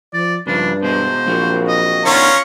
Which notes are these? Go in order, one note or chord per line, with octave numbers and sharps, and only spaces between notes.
F3 D5
G2 C#3 F3 D4
B2 G#3 C5
A#1 F#3 A#3 C4
D#5
D#3 B3 C#4 D4 F4 A#5 C#6